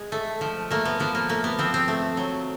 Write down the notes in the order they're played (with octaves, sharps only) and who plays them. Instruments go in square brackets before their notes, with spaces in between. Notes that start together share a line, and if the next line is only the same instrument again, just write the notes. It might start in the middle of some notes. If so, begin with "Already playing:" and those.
Already playing: [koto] G#3
A3
F3
A3 A#3
B3
F3 B3
A#3
A3 A#3
B3
F3 C4
C4
A3
F#3